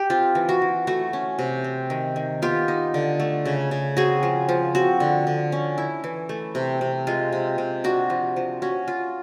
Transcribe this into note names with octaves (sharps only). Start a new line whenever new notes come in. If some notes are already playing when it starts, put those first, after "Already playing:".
Already playing: G4
C4 F4
E3
F#4
E3
A3 F#4
C#4
C3
C4
D#3
D#3
B3 F4 G4
D#4
D3
A3
C#3
C#3
C4 F#4 G#4
F3
F3
C4 F#4
D3
D3
C#4
E4
E3
A3
C3
C3
G#3 F4
C3
C3
D4 F#4
F3
F3
C#4 F#4
F4